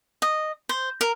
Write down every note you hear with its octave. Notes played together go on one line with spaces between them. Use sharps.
D#5
C5
A#4